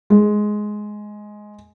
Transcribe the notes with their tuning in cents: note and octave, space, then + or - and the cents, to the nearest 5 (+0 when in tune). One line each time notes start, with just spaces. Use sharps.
G#3 +10